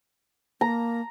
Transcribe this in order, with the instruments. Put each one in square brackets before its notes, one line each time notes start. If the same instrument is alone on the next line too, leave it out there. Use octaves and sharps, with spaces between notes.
[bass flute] A#3 [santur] A#5